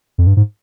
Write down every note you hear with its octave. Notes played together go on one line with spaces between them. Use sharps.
F2
G2
G#2